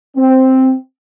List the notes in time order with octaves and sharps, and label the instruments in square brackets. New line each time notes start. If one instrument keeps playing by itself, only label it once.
[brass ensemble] C4